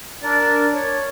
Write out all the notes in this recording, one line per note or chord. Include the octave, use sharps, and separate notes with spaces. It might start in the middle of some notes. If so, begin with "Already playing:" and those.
D4 A#4 D5
C#5